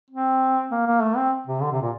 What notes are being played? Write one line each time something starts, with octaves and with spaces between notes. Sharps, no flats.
C4
A#3
A#3
A3
C4
C3
D3
C3
A#2